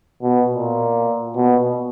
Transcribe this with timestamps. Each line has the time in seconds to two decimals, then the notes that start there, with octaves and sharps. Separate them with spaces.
0.21 B2
0.50 A#2
1.35 B2